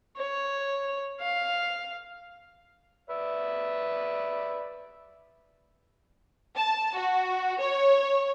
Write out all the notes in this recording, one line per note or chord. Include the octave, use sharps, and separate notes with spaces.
C#5
F5
B4 D5 E5
A5
F#4
C#5